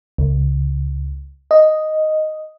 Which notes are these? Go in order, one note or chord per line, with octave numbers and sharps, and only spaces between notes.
C#2
D#5